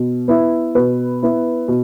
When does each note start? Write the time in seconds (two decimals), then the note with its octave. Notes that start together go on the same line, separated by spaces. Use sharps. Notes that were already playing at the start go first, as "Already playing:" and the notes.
Already playing: B2
0.28 B3 E4
0.75 B2 B4
1.23 B3 E4
1.68 B2